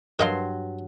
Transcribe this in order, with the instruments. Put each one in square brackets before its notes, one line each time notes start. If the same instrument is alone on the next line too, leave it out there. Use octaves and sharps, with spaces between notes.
[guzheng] G2 F#3 C6 [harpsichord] A#4 D#5 F5